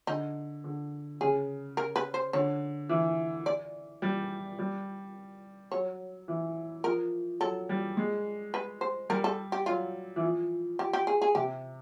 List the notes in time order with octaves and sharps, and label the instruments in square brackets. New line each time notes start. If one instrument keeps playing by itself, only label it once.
[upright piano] D3 [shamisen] D#4
[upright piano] D3
[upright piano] C#3 [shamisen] G#4
[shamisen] A#4
B4
C5
[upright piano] D3 [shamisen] C#5
[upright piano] E3
[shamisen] D5
[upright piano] G3
G3
[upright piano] F#3 [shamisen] C#5
[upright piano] E3
[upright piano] F3 [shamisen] A#4
[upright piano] F#3 [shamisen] A4
[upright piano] G3
G#3
[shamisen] B4
C5
[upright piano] G3 [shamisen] A#4
[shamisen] A4
G4
[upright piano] F#3 [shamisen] F4
[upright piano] E3
F3
[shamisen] G4
G4
G#4
G#4
[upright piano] C3 [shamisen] G4